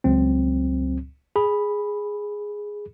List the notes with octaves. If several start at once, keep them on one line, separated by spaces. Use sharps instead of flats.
C#2 F#3 C4
G#4 B5